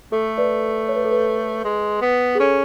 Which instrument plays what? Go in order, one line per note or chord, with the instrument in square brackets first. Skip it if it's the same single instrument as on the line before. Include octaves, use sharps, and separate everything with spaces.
[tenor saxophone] A3 [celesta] A4
[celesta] B4 D5
C#5
B4
A4
B4
[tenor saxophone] G#3
B3
[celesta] G#4
[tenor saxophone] C#4 [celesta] A4